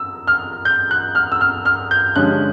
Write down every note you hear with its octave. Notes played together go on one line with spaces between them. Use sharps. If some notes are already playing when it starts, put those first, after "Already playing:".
Already playing: E6
F6
G6
F#6
F6
E6
F6
F6
G6
G2 D3 F3 G#3 C#4 F#6